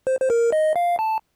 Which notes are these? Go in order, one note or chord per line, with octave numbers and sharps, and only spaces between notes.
C5
C5
A#4
D#5
F5
A5